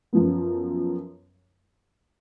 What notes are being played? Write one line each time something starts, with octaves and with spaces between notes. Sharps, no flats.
F#2 F3 B3